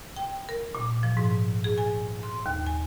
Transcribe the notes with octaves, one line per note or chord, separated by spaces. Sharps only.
G5
A#4
A#2
F3
G#2
G#4
G#5
C6
D#2
G#5